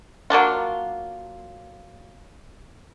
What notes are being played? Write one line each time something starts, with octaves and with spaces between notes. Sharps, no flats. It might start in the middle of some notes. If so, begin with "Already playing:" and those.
F#3 A#3 D4 F4